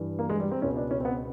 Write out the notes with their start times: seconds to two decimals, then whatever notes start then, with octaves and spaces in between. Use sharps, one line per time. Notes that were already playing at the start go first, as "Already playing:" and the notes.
Already playing: G2 E3
0.19 A#3
0.29 G#3
0.40 G3
0.51 C4
0.61 C#2 B2 C#4
0.76 D4
0.91 C#4
1.00 C4
1.05 B3